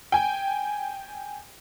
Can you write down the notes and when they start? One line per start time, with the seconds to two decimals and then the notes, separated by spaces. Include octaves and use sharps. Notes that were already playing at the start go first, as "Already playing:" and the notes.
0.12 G5 G#5